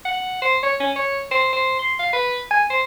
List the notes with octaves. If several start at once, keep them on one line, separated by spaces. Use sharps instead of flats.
F#5
C5
C#5
C#4
C#5
C5
C5
C6
F5
B4
G#5
C5